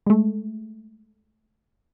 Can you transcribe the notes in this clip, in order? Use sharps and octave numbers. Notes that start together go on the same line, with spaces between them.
G#3 A3